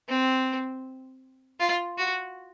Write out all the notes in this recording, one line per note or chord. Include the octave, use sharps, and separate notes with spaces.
C4
F4
F#4